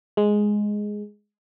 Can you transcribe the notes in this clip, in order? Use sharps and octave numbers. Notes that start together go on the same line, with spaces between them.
G#3